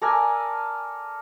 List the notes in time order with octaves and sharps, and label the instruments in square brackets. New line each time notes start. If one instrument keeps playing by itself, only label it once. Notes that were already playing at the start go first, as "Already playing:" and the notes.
[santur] A4 A#4 D5 G#5